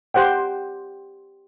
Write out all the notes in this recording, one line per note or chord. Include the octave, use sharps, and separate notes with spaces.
G4 C5 F#5 G5